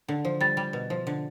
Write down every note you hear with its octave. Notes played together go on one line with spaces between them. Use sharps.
D3
F3
G3 A6
G3
B2
F3
D3